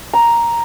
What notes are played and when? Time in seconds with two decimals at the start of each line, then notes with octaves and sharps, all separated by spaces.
0.13 A#5